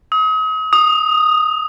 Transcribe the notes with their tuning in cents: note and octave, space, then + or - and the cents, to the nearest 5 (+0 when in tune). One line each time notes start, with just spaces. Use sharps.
D#6 +40
D#6 -10